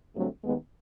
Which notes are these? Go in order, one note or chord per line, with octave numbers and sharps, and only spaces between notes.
G2 D3 F#3 A3 C4
D#2 D#3 G#3 B3